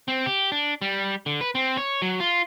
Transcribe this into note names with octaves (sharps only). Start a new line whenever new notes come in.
C4
G4
D4
G3
D3
B4
C4
C#5
F#3
F4